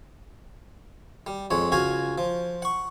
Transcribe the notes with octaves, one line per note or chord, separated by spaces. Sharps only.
G3
F2 G#3 C#5
C#2 F#4 F5 G#5
F3
F#5 C#6